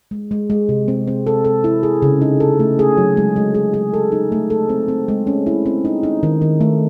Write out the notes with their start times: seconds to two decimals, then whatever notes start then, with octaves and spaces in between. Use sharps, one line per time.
0.11 G#3
0.31 G#3
0.50 G#3
0.69 C3
0.88 C4
1.08 C4
1.27 A4
1.45 A4
1.64 E4
1.83 G#4
2.02 C#3
2.21 D#4
2.40 A4
2.59 A3
2.79 G#4
2.97 F#3
3.17 G#3
3.36 G#3
3.54 G#4
3.74 G#4
3.94 A4
4.12 D#4
4.32 A3
4.50 A4
4.69 C4
4.88 C4
5.08 G#3
5.27 C#4
5.46 E4
5.66 C4
5.85 D#4
6.03 D#4
6.23 D#3
6.41 D#3
6.61 A3